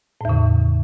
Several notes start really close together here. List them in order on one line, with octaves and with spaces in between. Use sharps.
A2 E2 C#3